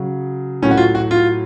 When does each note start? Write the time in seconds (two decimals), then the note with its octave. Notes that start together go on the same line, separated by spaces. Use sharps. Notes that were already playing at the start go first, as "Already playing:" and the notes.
Already playing: C#3 F#3
0.62 A2 C#4
0.66 F#3
0.71 F#4
0.77 F4
0.95 F#4
1.11 F4